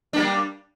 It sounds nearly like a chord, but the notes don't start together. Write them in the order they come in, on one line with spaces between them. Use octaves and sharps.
D4 A#3 G3